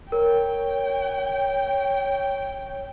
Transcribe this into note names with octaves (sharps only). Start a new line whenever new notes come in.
A#4 C#5 G5